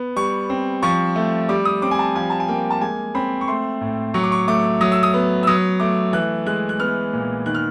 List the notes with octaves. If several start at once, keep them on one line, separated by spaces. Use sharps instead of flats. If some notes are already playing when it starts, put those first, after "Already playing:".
Already playing: B3
G3 C#6
C4
F3 C#6
A3
G3 D6
D#6
C4 D6
G#5
A5
F3 G#5
A5
G#5
A#3 G5
A5
G#3 G#5
C4 B5
C#6
A3 C6
A2
F#3 C#6
D6
C#6
A3 D6
F#3 D#6
E6
D#6
B3
E6
F#3 D#6
A3 D6
E3 F#6
G#3 F#6
F#6
B3 F6
A#2
D#3 F#6
F6